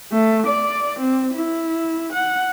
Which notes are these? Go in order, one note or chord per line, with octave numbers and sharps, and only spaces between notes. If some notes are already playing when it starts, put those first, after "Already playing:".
A3
D5
C4
E4
F#5